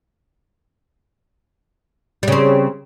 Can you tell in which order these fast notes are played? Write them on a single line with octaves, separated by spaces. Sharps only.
G3 C#3 C4